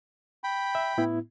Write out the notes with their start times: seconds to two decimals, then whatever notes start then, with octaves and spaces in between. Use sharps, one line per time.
0.44 G5 B5
0.75 E5
0.98 A2 B3 E4